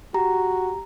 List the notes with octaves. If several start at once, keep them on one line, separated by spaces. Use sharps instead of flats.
F#4 G4 A#5